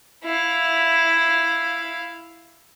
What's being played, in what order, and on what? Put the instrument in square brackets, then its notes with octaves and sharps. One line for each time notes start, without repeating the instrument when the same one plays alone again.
[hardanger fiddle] E4 F5